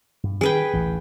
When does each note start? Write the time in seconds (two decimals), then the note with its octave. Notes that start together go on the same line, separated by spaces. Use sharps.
0.24 G2
0.41 D#3 G#4 B4 G5
0.73 A1 D2 E3